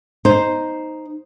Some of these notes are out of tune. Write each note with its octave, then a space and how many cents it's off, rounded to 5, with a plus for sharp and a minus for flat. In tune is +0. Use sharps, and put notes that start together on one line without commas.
D#4 +0 C5 +0